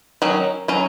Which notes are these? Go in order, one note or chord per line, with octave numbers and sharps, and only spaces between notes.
D#3 F#3 C#4
F#3 C#4